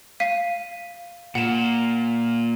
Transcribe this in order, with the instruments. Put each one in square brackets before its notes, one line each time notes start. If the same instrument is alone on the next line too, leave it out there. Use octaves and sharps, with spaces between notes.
[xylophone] F5 B6 D#7
[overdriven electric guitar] A#2 [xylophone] F#5 E7